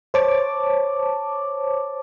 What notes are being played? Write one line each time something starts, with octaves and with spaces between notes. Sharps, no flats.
C5 C#5 A5 D6